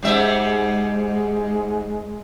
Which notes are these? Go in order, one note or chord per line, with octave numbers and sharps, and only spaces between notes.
G#2 G3 G#3 E5